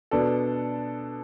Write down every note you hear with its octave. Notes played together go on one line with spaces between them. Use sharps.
B2 B3 D4 A4 D5